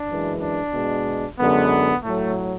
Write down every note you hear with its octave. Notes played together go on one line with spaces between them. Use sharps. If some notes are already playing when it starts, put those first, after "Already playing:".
Already playing: D4
F#2 E3 G#3
D4
B2 G#3
F#2 D3 G#3 B3
A2 F#3 A3